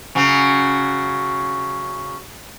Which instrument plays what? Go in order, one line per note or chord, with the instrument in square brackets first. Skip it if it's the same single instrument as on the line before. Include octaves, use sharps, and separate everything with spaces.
[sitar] C#3 F#3